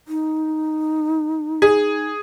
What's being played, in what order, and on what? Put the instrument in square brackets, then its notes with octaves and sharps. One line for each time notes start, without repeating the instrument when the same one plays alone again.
[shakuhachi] D#4
[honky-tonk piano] G#4